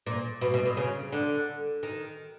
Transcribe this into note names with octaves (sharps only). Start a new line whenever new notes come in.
A#2
B2
B2
A#2
C#3
D3
D#3